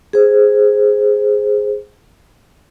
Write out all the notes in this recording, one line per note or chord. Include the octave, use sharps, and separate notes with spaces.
G#4 C5